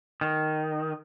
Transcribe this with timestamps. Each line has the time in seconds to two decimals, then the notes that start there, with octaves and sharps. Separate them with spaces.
0.21 D#3